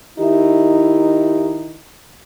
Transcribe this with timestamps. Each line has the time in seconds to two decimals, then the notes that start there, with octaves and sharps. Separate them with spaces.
0.18 D#3 D#4 E4 G4 E5